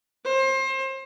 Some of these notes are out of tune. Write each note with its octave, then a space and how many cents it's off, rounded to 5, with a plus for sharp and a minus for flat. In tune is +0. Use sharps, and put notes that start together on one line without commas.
C5 +30